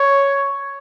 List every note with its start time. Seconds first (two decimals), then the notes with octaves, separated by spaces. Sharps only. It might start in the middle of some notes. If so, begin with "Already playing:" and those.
Already playing: C#5